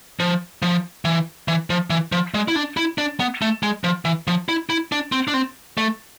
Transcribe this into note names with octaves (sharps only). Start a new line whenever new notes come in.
F3
F3
E3
E3
F3
E3
F3
G#3
E4
D4
E4
D4
B3
A3
G#3
F3
E3
F3
E4
E4
D4
C4
D4
C4
A3